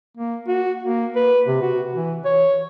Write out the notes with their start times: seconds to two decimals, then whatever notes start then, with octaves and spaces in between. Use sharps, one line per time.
0.17 A#3
0.48 F#4
0.83 A#3
1.16 B4
1.48 C3
1.62 F#4
1.94 E3
2.25 C#5